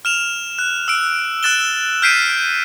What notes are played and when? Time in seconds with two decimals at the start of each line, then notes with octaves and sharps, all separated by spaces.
0.05 F6 E7 F7
0.59 F#6
0.88 E6 D7
1.43 E6 F#6 A6 E7 G7
2.02 F6 G6 B6 C7 D7 D#7